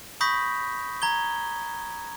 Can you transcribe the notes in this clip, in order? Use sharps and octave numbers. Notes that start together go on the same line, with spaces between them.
B5 C#6 D#6 G6 A#6 B6
A#5 G#6 G7